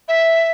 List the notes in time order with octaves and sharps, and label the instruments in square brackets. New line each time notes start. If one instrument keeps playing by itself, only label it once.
[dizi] E5